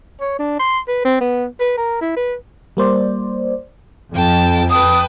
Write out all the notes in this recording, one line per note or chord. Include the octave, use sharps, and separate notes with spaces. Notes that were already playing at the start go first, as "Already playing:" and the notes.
C#5
D4
C6
B4
C4
B3
B4
A#4
E4
B4
G3 A#3 C5 D5
F2 G5 A5
B4 G5 A5 D#6